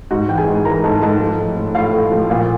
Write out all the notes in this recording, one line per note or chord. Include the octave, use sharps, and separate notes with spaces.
G#2 F#4 F#5
E3 G5
G#4 G#5
G#2
E3 A#4 A#5
G#2 A4 A5
G#2 A4 A5
F3
A2
A2
A2 F4 F5
A2
F3
A#2 F4 F5